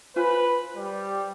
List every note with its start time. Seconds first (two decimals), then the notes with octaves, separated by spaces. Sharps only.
0.16 F4 B4 C5 G#5
0.76 G3